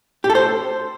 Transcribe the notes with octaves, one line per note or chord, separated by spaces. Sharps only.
G4
A4
C5